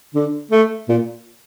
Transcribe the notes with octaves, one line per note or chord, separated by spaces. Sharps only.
D3
A3
A#2